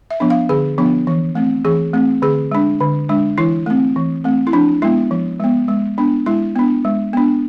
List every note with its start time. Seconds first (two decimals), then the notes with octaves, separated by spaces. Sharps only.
0.11 E5
0.20 F3 B3 D4
0.30 F5
0.49 D3 G#4
0.78 F3 B3 D4
1.07 E3
1.35 A3 C4
1.65 E3 G#4
1.94 A3 C4
2.22 D3 G#4
2.51 G#3 D4
2.80 D3
3.09 G#3 D4
3.38 E3 E4
3.66 A3 C4
3.96 E3
4.24 A3 C4
4.47 E4
4.53 F3 D4
4.82 G#3 B3 E4
5.11 F3
5.40 G#3 B3
5.68 G#3
5.98 B3 D4
6.26 G#3 E4
6.56 B3 D4
6.85 G#3
7.13 B3 D4